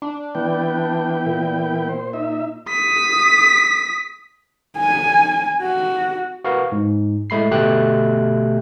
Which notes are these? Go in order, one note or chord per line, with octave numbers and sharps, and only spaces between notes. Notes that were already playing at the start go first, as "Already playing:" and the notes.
D4
E3 B3 G5
A#2
C5
D#4 E5
D#6 B6
G#5
F#4
F#4 A#4 B4 F5
G#2
A2 G#3 A3 B5 C7
G1 B2 A3 G4 G5 F#6